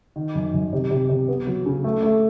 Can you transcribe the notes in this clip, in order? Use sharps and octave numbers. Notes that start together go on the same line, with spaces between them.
D#3
F#2
F#2
C3
C3
C3
B3
F#3
C#3
A3
A3